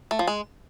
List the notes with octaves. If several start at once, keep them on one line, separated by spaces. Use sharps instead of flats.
A3
F3
G#3